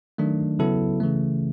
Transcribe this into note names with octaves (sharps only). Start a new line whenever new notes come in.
D#3 F#3 A3 D4
C#3 F#3 B3 E4 A4
C#3 E3 A3